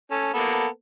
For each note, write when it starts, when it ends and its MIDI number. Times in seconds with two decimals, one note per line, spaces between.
0.11 0.32 61
0.11 0.32 69
0.34 0.67 58
0.34 0.67 59
0.34 0.67 69